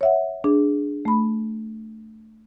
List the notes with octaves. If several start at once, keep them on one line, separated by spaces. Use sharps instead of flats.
C#5 E5 F#5
D4 G#4
A3 B5